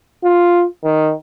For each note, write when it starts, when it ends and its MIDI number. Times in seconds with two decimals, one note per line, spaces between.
0.24 0.65 65
0.84 1.13 51